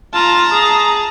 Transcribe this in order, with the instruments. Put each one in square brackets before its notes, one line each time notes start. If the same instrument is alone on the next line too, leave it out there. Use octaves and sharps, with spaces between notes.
[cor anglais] F4 [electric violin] A5 A#5
[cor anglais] G#4